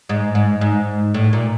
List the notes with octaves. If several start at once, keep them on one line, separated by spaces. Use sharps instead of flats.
G#2
G#2
G#2
A2
A#2